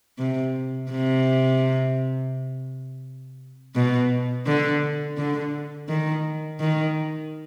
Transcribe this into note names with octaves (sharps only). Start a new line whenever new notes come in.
C3
C3
B2
D3
D3
D#3
D#3